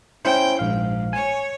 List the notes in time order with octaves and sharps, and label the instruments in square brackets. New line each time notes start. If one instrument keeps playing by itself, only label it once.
[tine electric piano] C#4 E4 C5 [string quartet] G5
[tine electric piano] A#1 F5 [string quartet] G#2
[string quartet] C#5 [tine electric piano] G#5